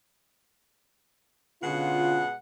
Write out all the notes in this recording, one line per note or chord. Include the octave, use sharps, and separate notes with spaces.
B2 D3 G#3 C#4 F4 F#5